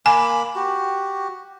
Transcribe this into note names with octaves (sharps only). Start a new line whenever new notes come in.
A#3 G#5 B5 D6
F#4 G4